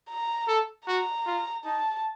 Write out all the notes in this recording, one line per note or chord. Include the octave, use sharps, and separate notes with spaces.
A#5
A4
F#4 A#5
F4
D#4 A5